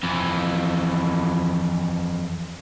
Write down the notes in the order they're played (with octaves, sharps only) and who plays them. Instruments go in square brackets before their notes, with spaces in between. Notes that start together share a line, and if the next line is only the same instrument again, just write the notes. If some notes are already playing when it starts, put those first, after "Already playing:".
[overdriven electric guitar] F2 E3